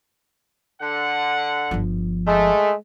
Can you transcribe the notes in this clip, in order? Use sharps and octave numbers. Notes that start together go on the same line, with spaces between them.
D3 F#5
G1 F3
G#3 A3